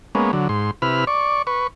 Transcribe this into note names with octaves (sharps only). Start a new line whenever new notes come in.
G#3 A#3 B3 C#4
D3 F#3
G#2 C6
C3 E4 B4 B5 F6
D5 C#6
B4 C#6